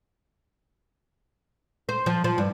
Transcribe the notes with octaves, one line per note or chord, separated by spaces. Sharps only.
C5
F3
F3
G2